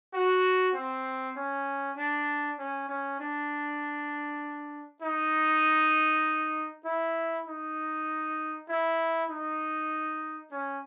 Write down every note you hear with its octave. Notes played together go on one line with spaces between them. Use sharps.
F#4
C4
C#4
D4
C#4
C#4
D4
D#4
E4
D#4
E4
D#4
C#4